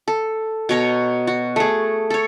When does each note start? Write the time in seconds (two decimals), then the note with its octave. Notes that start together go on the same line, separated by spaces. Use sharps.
0.08 A4
0.69 B2 C#5 A#5
1.27 F#4
1.56 A3 G#4
2.10 A4 C#5